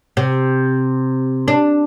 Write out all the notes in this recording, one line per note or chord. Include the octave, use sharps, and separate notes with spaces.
C3
D4